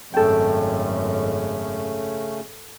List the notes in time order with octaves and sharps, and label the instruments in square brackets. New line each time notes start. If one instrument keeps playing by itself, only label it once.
[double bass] G#1 F#2 [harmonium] C#3 A3 C#4 [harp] A4 G5